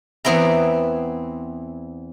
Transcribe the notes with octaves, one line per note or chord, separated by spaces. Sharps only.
E2 B3 C4 E4 A#5